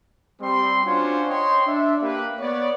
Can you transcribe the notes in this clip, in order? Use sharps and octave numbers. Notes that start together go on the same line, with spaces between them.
G3 C4 C6
C#4 D4 F4 F#4 C5 C#5
C#5 D#5 G5 C6
D4 E5
A#3 G4 B4
B3 C#5 D5